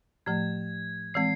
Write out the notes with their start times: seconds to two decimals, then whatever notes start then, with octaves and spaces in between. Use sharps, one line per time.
0.26 A2 F3 A3 G#6
1.14 E3 G#3 C4 C7